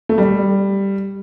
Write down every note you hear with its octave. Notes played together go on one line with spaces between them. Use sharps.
A3
G3